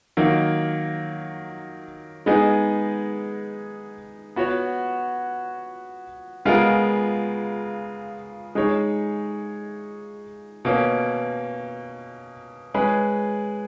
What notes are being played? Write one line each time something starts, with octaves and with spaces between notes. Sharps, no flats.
D#3 F#3 A#3
G#3 B3 D#4 G#4 D#5
B3 F#4 C#5
C#3 G#3 B3 F4 A#4
G#3 D#4 G#4 C#5
B2 A#3 C#4
G#3 C#4 G#4 B4